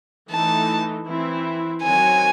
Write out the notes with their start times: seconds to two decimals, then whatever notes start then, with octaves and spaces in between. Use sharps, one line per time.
0.31 E3 A3 D#4 A5
1.07 E3 C4 E4
1.83 D#3 F#3 C4 F#4 C#5 G#5